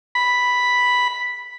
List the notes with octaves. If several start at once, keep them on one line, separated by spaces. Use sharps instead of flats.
B5